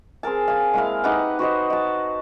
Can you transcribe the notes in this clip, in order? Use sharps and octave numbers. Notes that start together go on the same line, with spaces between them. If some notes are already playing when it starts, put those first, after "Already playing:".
C4 G#4 A#4 A5
F5 G#5
G#3 A#3 E4 F5
D#4 G4 B4 F#5
F#4 B4 C5 D#5
D#5 A5